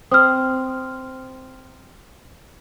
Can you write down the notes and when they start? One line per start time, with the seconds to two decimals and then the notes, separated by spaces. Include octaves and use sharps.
0.11 C4 D#6 F6